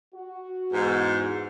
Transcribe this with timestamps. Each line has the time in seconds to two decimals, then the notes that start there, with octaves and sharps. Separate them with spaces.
0.14 F#4
0.73 E2 G#2